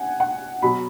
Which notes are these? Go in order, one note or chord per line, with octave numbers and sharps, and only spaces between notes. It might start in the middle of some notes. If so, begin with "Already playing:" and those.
Already playing: F#5 G#5
F#5
B2 F#3 B5